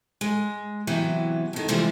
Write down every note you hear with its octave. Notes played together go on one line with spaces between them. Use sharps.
G#3
C3 E3 F#3 B3 G4
F2 D#3
C3 E3 F3 G3 G#3